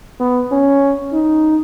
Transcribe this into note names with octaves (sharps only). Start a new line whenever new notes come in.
B3
C#4
D#4